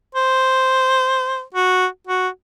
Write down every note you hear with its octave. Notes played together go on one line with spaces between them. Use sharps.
C5
F#4
F#4